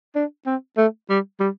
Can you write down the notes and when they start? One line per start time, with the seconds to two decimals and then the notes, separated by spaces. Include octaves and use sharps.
0.15 D4
0.46 C4
0.77 A3
1.10 G3
1.40 G3